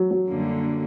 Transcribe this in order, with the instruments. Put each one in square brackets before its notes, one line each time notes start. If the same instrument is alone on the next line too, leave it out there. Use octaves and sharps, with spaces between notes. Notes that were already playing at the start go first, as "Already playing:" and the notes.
Already playing: [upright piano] F#3
F#3
[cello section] F#2 D3 G3 A#3